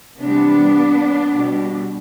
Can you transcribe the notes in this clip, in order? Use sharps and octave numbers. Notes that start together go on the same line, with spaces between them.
C3 E3 G3 B3 D4
B2 G3